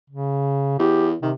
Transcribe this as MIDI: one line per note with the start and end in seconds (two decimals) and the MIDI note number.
0.10 0.76 49
0.79 1.14 40
0.79 1.09 67
1.22 1.33 48
1.22 1.30 51